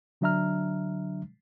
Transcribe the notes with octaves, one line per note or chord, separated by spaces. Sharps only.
D3 F#3 D4 E5 A#5 F6